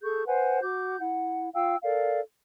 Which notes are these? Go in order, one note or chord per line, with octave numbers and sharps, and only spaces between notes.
G#4 A4 C#6 G6
B4 C5 F#5 G#5
F#4 D6 G6
E4 F#5
F4 F5 G5 E6
A4 A#4 D5 F5